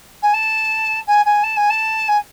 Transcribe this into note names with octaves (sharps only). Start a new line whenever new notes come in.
G#5
A5
G#5
G#5
A5
G#5
A5
G#5